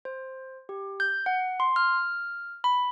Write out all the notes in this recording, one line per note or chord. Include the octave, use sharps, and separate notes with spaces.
C5
G4
G6
F#5
C6
F6
B5